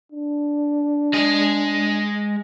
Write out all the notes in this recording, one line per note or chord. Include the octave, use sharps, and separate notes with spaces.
D4
G#3 G#4